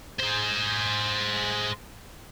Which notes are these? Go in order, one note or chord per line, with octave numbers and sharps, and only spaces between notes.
G#4 C5